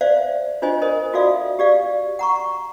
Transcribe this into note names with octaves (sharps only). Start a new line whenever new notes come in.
C5 D5 E5 F5
D4 F4 C5 D#5 G#5
A#4 C5 D#5
F4 F#4 A4 D5 E5 F5
G4 D5 F5
F#5 A#5 C#6